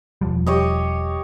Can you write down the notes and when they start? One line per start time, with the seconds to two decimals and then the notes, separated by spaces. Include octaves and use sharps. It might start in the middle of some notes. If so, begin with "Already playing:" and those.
0.21 E1 F3 G3
0.47 G4 C#5 D#5